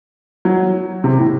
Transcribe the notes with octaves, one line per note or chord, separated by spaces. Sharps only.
F#3
C3
A2